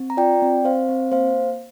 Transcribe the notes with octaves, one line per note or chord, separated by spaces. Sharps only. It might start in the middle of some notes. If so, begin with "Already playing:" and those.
Already playing: C4
A#5
F4 D5 G5
C4
C4 C5 F5
C4
A#3 C5 F5